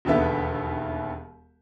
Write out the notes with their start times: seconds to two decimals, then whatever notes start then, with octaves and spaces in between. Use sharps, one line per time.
0.05 E1 D#2 D3 B3 E5